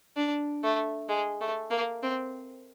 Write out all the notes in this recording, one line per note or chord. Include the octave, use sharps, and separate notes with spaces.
D4
A3
G#3
A3
A#3
C4